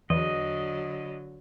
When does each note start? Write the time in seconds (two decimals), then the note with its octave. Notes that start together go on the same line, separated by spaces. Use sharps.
0.10 E2 D3 F#3 D#5